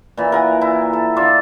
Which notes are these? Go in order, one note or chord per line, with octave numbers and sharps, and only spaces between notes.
A#2 E3
A#4 F#5 G#5
E4
A4
D3 F4 E5 D6